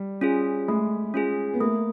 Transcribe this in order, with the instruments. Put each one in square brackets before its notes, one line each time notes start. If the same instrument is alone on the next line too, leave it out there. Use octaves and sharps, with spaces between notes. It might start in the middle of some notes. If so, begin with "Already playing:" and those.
Already playing: [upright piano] G3
[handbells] C#4 F4 G#4
[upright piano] G#3 [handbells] A3
[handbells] C#4 F4 G#4
[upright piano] B3
[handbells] A3 [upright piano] A#3